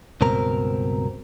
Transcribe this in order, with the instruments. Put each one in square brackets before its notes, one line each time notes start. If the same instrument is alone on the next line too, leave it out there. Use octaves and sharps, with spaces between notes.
[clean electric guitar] C#2 G2 B2 C4 A#4 A#5